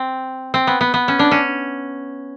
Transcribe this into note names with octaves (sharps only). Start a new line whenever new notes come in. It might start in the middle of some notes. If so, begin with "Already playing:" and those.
Already playing: C4
C4
B3
B3
B3
C#4
D4
C#4